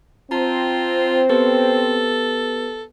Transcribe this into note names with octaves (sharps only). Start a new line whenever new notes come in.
C4 F4 C5 A5 A#5
B3 G4 A4 B4